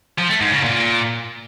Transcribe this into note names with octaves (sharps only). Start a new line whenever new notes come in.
F3
A3
G#2
C#3
A#2